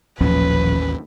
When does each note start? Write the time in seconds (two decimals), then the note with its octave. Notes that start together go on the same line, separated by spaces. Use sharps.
0.21 D#1 A1 D#2 F3 F#3 C#4 B4